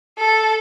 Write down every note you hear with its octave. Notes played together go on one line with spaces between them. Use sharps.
A4